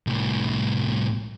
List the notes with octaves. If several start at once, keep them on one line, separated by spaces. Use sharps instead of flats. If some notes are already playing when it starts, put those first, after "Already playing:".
C2 A2